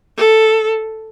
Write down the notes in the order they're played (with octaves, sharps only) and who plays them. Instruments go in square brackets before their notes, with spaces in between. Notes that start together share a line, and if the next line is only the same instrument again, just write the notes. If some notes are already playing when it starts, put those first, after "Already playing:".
[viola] A4